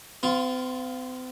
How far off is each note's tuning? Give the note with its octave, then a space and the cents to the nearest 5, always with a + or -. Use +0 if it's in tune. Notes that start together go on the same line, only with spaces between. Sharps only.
C4 -45 F4 +0